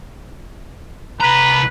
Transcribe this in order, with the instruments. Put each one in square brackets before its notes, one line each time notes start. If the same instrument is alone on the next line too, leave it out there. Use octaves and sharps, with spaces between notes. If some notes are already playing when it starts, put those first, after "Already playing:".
[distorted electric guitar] C2 A#5 [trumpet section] B4